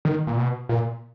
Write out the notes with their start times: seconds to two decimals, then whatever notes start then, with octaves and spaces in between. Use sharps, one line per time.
0.05 D#3
0.27 A#2
0.38 B2
0.69 A#2